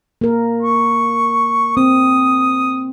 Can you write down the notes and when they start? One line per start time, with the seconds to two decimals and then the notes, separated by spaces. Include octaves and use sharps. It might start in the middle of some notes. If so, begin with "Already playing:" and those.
0.21 A#3 A#4
0.63 C#6
1.77 C4 D#6